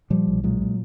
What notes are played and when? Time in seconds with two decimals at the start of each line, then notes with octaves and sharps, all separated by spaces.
0.10 A#2 F3 G3
0.27 B1
0.44 A#2 F#3 G#3
0.61 A#2